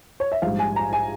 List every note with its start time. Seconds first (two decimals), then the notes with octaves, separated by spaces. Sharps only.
0.20 C#5
0.32 E5
0.42 A#1 G#2 G3 F5
0.59 G#5
0.76 A#5
0.93 G#5